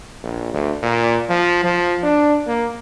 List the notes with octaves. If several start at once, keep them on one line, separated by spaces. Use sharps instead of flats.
A#1
D2
A#2
F3
F3
D4
A#3